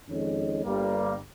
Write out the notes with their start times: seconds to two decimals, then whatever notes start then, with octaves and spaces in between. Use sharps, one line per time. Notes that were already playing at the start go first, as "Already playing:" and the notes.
0.09 F2 D#3 G#3 C#4
0.64 G1 G2 G3 A#3